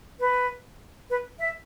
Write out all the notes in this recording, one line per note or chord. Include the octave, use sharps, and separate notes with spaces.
B4
B4
E5